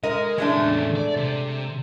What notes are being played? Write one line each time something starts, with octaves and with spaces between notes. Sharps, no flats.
G#3 A#4 D#5
A2 G#3 A3 D4
E2 A2
D5
C3